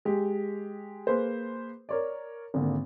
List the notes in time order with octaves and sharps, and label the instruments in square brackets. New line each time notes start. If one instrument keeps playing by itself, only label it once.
[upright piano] G#3 G4
A#3 G#4 B4 C5
A#4 C#5 D5
G#1 D3 A#3